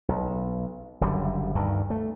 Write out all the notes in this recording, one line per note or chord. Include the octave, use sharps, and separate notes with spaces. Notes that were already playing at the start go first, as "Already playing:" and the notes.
B1
F#1 F#2 D3 G3
D2 G2 D#3
A3